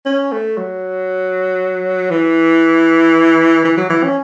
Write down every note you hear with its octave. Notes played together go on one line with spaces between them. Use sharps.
C#4
A3
F#3
E3
E3
F#3
E3
C#4